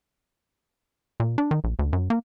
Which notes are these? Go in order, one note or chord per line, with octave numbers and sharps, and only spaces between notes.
A#2
D4
D#3
A#1
D2
F#2
A#3